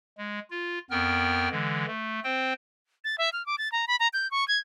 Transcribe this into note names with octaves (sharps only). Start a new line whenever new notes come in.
G#3
F4
F2 B3 A#4 G5 F6
D3 E3 G#3
A3
C4 C5 G5
A6
E5
F6
D6
A6
A#5
B5
A#5
G6
C#6
G#6